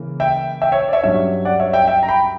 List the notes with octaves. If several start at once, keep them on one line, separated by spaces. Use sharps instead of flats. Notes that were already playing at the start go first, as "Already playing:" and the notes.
Already playing: C#3 E3 A#3
E5 G5
E5 G5
C#5 E5
D5
C#5 E5
G2 F#3 C#4 C#5 E5
D5 F#5
C#5 E5
E5 G5
E5 G5
A#5
G5 B5